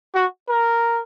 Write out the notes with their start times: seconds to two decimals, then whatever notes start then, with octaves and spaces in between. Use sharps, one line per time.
0.14 F#4
0.49 A#4